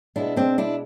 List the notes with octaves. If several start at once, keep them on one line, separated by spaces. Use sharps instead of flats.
B2 G#3 B3 D4 E4
C4 D4
D4 E4